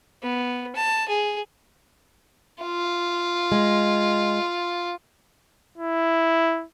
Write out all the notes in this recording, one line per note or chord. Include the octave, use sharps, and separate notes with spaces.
B3
A5
G#4
F4
G#3
E4